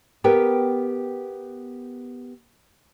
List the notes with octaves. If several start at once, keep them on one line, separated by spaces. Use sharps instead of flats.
B3 G4 A#4 B4 G5